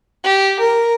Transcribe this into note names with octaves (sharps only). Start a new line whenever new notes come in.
G4
A#4